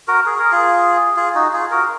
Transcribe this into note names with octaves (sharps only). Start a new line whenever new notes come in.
F#4 A#4
G#4
A#4
F4 G#4
F4 G#4
D#4 F#4
F4 G#4
F#4 A#4